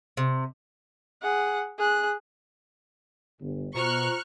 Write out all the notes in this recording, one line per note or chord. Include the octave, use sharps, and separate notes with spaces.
C3
G#4 F#5
G#4 F#6
G1
B2 F4 C5 A#5 C#6 F6 F#6